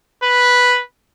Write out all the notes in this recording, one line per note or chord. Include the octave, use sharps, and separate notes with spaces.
B4